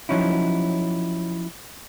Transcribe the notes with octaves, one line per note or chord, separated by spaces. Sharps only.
F3 F#3 C#4 D#4 E4